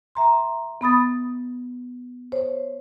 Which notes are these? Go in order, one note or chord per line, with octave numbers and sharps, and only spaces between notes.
E5 A#5 C6
B3 B5 D#6 A6
C5 C#5